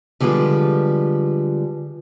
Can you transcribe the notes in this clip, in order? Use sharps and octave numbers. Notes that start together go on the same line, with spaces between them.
D3 F3 G3 G#3 B4